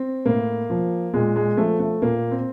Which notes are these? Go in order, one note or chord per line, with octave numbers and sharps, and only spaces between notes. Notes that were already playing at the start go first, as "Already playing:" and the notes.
Already playing: C4
A2 A#3
F3
A#2 G#3
G#3
F3 A3
A3
A#2 A#3
C4